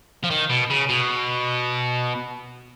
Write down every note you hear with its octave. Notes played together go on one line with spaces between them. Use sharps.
F3
D#3
B2
C#3
B2